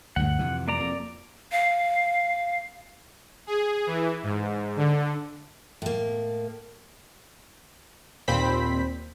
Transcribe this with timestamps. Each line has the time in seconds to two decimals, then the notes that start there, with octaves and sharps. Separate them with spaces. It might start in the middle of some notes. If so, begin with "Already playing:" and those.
0.16 D2 G2 F#5
0.39 F2 C3 E3
0.68 A#3 D5 A#5
0.80 F2
1.52 F5
3.47 G#4
3.87 E3
4.23 G#2
4.76 D3
5.82 A2 A#3
8.28 D#2 A#2 C4 C5 B5 B6